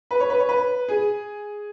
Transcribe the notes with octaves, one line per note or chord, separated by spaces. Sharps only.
B4
C#5
B4
C#5
B4
G#4